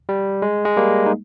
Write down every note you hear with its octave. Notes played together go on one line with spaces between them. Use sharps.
G3
G#3
G#3
G3 A#3
D#4